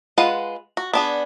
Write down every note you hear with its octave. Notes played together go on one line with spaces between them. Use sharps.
G#3 F4 B4 F#5
F#4
B3 D4 G#4